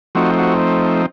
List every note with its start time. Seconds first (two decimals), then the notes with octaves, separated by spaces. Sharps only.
0.15 F3 A3 C4 D#4 F#4
0.38 F#4